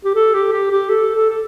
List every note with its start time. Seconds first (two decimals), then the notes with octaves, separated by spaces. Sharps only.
0.04 G4
0.15 A4
0.34 G4
0.52 G4
0.71 G4
0.89 A4
1.15 A4
1.30 A4